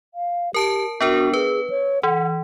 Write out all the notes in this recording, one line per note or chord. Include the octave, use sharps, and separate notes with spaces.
F5
G4 A#4 A5 D7
B3 D4 F#4 A#4
G#4 B4
C#5
E3 F#5